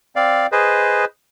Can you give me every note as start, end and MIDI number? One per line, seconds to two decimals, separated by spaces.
0.16 0.47 60
0.16 0.47 74
0.16 0.47 77
0.52 1.05 68
0.52 1.05 71
0.52 1.05 72
0.52 1.05 75